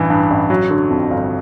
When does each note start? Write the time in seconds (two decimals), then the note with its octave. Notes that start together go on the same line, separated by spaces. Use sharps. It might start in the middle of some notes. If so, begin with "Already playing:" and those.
Already playing: A1 G2 E3
0.10 G2
0.30 A1
0.50 F#3
0.70 D3
0.90 F2
1.10 G1